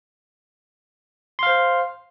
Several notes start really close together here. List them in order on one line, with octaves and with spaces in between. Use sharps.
C6 F5 C5